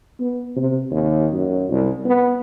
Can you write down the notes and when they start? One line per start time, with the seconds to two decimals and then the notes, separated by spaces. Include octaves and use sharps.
0.20 B3
0.57 C3
0.91 D#2
1.32 F#2
1.70 C2
2.05 B3